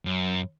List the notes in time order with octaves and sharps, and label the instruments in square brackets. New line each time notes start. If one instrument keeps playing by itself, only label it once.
[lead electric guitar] F#2